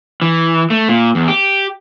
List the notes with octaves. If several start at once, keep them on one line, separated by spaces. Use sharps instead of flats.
E3
A3
A#2
E2
G4